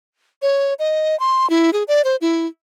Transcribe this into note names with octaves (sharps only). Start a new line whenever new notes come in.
C#5
D#5
C6
E4
G#4
D5
C5
E4